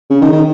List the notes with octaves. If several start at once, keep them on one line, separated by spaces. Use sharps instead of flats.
C#3
D#3
D#3